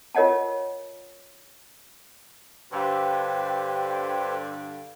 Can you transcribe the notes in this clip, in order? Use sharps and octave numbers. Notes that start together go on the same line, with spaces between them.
F4 A#4 C#5 D#5 F#5 A5
G2 D3 G4 B4 C5 F5 G5 E6